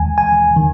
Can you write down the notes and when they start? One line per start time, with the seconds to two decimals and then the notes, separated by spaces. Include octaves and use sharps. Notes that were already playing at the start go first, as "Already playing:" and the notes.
Already playing: D#2 D#3 G#3 G#5
0.18 G#5
0.56 D#3